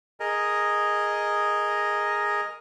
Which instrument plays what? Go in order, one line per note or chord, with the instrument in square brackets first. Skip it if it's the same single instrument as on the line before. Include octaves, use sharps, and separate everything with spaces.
[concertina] G#4 A#4 D#5